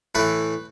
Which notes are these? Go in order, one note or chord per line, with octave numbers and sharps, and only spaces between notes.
A2 E3 B4